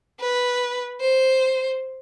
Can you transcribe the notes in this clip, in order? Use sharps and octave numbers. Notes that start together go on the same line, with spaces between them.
B4
C5